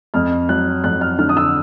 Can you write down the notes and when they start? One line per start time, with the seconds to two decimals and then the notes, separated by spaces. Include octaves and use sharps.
0.14 F2 F6
0.49 F#3 F#6
0.84 F2 F#6
1.01 F6
1.19 D3 F6
1.29 D#6
1.37 E6